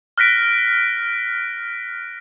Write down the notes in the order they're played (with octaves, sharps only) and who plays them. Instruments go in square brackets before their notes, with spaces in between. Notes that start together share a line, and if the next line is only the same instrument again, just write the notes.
[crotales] F6 F#6 A#6 B6 D7